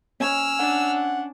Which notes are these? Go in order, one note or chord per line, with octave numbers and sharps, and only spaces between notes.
C#4 G#5 E6 F6
D4 F#5